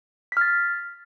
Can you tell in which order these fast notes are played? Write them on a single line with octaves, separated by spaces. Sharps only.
B6 F6 A6